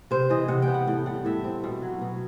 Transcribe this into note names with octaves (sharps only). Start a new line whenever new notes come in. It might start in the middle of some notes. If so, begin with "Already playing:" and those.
C3 C5
E3 D#5
C3 F#5
G5
B3
F#5
A2 G5
G3 F#5
A2 E5
C4
B2
F#3
B2